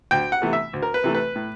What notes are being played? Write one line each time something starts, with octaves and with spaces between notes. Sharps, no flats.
D2 G5
F#5
C3 E3 A3
E5
D2
A#4
B4
C3 E3 A3
B4
A2